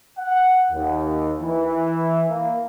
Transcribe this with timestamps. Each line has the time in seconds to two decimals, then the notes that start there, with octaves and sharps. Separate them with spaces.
0.18 F#5
0.72 D#2
1.42 E3
2.29 A#3